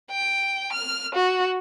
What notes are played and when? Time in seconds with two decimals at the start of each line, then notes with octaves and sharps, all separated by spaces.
0.11 G5
0.73 F6
1.15 F#4